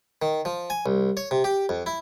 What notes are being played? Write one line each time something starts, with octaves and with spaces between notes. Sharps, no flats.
D#3
F3
G#5
C2
C#5
C3
G4
F2
E4